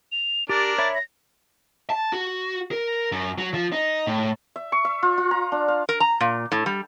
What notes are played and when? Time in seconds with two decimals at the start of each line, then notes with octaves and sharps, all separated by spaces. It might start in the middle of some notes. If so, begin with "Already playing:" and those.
0.12 F7
0.49 D4 G4 A#4 A6
0.78 C#5 E5 B5 A6
0.95 A#6
1.90 A5
2.13 F#4
2.71 A#4
3.12 F#2
3.38 F#3
3.54 F3
3.72 D#4
4.07 A2
4.56 E5
4.72 C#6
4.85 E5
5.03 F4
5.18 F4
5.31 A#5
5.52 D4
5.68 F5
5.89 A#4
6.00 A#5
6.21 A#2
6.52 A2
6.66 G3